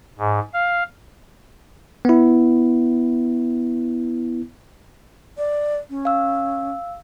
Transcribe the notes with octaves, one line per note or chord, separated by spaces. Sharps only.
G#2
F5
B3 E4
D5
C#4
F5 E6